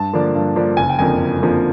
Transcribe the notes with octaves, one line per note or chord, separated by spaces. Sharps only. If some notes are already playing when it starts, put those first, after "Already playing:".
Already playing: G2 A5
D3 F3 A#3 D4
G2
D3 F3 A#3 D4
F#1 G#5
G5
F2 D3 F3 A#3 G#5
F#1
F2 D3 F3 A#3